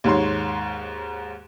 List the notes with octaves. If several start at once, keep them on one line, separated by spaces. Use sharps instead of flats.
D#2 G#2 C#5 C6